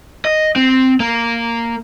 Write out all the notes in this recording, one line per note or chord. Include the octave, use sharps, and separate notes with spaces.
D#5
C4
A#3